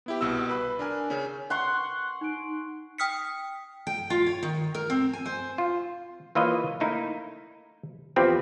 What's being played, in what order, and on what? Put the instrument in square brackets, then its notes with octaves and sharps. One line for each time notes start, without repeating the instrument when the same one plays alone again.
[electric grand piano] B3 E4 G4
C2 B2 F#4 E6
B4 B5
D4 A#4 G#5
C#3 C#4
[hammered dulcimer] F#5 C6 C#6
[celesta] D#4 D7
[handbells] G5 D#6 F6 B6 C#7
[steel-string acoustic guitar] G5
F4
C#5
D#3
A#4
C4
G#5
C5
[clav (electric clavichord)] F4
E3 A#3 F4 B4 C#5 D#5
A3 A#3 D#4 E4
E2 F3 C4 G4 B4